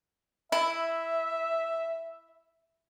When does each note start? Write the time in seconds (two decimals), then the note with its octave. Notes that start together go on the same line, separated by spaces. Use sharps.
0.52 E4 E5